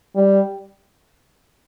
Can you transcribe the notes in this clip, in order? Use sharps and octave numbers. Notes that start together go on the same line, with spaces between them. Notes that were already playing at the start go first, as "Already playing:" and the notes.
G3